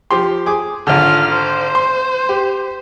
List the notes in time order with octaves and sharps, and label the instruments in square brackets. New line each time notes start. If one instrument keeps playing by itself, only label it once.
[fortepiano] F3 G4 C6
G#4 D6
[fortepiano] G#1 D3 [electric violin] F4 F6
[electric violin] C5
[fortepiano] C6
G4